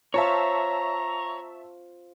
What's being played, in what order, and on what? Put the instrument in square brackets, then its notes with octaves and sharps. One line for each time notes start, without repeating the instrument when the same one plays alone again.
[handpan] F4 C5 F5 [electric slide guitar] C#5 [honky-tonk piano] E5 A5 C#6 [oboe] A#5